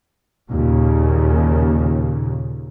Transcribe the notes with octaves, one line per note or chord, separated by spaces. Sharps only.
D#2 A#2 C#3